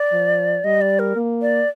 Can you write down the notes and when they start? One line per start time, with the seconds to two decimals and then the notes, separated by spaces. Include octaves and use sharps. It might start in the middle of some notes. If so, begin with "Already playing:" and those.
Already playing: D5
0.13 F3
0.64 G3 D#5
0.81 D5
0.99 A#4
1.16 A#3
1.42 D5